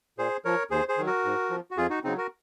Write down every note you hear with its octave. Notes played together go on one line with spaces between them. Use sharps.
A#2 G#4 C5
F3 A#4 C#5
D#2 G#4 C5
G#4 C5
D#3 F#3
F#4 A#4
G#2
F3
F#4
F2 F4 G#4
D#4 F#4
C#3 F#3 C4 D#4
F#4 A#4